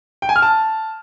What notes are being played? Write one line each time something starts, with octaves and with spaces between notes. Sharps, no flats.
G5
G#5
F6
A5